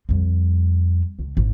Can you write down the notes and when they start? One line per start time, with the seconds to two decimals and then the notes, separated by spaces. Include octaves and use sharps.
0.09 F2 G3
1.19 C#2
1.37 G#1